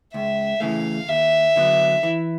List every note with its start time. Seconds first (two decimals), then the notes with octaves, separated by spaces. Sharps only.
0.14 C#2 E5
0.60 C#3 E3 A3 F5
1.08 D#2 E5
1.56 D3 F#3 B3
2.03 E3